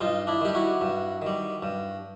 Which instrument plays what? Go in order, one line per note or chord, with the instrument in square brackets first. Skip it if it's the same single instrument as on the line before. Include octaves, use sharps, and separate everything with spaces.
[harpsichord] G2 D#4 F4
D4 E4
D#3 G3 G4
E4 F#4
G2
D#3 G3
G2